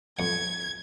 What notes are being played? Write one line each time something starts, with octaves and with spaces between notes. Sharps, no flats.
F2 F#5 G#6